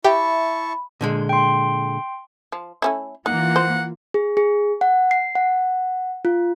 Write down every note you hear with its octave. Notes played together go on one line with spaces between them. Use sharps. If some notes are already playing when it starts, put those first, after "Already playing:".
E4 G4 E5 A5 B5 C#6
A#2 D3 G#3
G5 C6
F3
A3 C#4 E4
E3 A#3 D#4 F4 F#5
C5
G#4
G#4
F#5
C7
F#5
F4